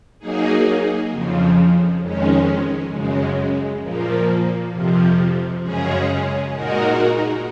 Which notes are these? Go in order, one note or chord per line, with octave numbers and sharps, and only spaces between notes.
F#3 A#3 D#4 G#4
F2 C#3 F3
F2 D#3 G#3 C#4
F#2 C#3 G#3
A#2 F3 A#3
F2 C3 F3
F#2 C#3 G#3 C#4 G#4
A#2 G#3 D#4 F#4 A#4